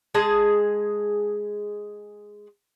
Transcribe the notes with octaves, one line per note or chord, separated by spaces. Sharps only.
G#3 G#4 A5